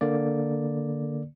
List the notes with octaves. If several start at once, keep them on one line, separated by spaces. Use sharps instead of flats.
D3 A#3 D5